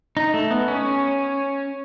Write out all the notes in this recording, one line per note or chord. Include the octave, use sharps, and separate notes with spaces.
D#4
A3
B3
C#4